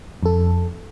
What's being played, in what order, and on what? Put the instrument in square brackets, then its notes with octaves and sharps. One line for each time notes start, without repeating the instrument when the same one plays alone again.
[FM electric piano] F2 A4